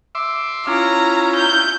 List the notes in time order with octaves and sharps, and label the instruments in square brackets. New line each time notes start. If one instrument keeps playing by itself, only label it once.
[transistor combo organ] E5 C6 D6
[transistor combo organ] C#4 E4 F4 [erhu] A#5
[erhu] G6